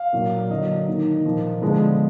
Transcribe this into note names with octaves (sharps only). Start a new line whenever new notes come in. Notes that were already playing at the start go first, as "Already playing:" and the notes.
Already playing: F5
A#2 F#3 A#3
D3 F#3 A#3 D#5
D#3 A#3
A#2 F3 A#3
D3 F3 G#3 B3